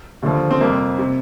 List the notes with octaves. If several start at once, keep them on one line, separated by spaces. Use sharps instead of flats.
D#2 D3 F3
C4
F2 C3 G3 A#3
C3